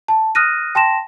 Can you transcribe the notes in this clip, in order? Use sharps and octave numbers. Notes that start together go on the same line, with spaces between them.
A5
D#6 F6 F#6 A#6 D#7
G5 A5 C6 A#6 E7